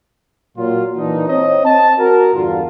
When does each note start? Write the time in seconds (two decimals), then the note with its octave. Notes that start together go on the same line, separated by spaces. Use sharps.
0.57 A#2 F#3 F4
0.97 A#2 E3 D4 D#4
1.29 C4 C#5 D#5
1.65 C4 A5
1.98 F#4 A#4
2.34 E2 G2 D3 F4